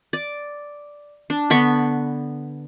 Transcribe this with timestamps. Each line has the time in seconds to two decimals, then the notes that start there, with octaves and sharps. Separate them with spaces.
0.13 D5
1.30 D4
1.50 D3 B3 B5 C#6